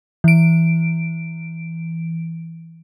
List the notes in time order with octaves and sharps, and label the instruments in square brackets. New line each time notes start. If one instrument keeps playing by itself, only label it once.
[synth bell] E3 D7